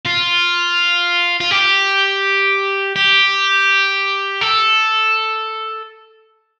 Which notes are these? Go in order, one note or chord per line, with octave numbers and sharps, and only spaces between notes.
F4
F4
G4
G4
A4